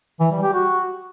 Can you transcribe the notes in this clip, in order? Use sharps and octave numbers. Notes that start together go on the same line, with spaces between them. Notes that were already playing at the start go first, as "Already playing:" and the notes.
E3
G3
G4
F#4